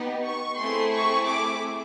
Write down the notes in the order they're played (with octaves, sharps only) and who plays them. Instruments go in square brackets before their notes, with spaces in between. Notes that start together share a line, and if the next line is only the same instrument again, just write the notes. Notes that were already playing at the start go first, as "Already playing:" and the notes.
Already playing: [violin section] B3 D#4 G4
C#6
A3 C4 E4 G#4 C6
C#6
D6